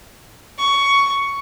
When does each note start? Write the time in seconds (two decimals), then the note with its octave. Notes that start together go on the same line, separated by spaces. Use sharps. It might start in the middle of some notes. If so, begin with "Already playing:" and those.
0.58 C#6